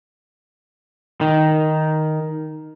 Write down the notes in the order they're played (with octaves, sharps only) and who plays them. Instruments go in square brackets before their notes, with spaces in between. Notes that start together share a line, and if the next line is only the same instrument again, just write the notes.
[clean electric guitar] D#3